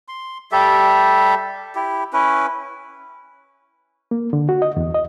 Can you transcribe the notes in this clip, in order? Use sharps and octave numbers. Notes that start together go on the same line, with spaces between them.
C6
G3 G4 A4 E5
E4 G4
C#4 E4 B4
A#3
D3
F#4
D#5
E2
D#5